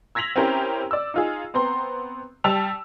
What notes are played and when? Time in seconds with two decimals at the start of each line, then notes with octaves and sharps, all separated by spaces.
0.15 E6 G#6 A#6 B6 F7 F#7
0.36 C4 C#4 E4 G4 A#4 C5
0.91 D5 E6
1.14 D#4 F4 G#4
1.54 B3 C4 A#5 C6
2.44 G3 G5 A5 E6 F7